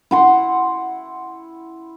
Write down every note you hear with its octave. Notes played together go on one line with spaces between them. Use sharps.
E4 F#5 C6